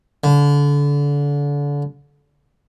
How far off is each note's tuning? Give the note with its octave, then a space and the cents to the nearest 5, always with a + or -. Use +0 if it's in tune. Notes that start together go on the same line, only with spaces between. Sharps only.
D3 -30